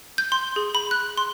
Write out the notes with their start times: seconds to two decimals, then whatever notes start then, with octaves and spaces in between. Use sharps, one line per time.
0.18 G6
0.32 C6
0.56 G#4
0.75 B5
0.91 F#6
1.17 C6